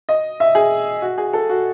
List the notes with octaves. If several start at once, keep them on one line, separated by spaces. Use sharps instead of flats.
D#5
E5
G#4
F#4
G#4
A4
F#4